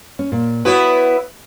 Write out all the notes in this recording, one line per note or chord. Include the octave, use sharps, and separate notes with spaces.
C#4
A#2
B3 E4 F#4 B4 C#5